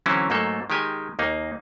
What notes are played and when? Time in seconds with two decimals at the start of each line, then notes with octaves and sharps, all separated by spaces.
0.06 D3 E3 F#3 C4 C#4 E4
0.30 G#2 F#3 A3 A#3 A4
0.70 D#3 G#3 G4 G#5
1.19 D#2 A#3 D#4